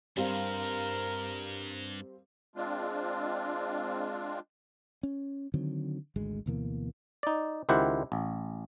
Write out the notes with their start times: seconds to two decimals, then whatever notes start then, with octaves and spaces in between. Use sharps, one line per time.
0.17 G2 G3 C4 A#4 F5
2.56 G#3 C4 D4 F4
5.03 C#4
5.54 D3 D#3 F#3 C4
6.16 G#1 D2 G#3
6.46 D2 B2 E3 A#3
7.23 D#4 D5
7.69 C#2 D#3 E4 G4 C5 F#5
8.12 A1